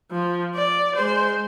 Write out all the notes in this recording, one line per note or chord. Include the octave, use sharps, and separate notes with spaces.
F3
D5
G#3 C5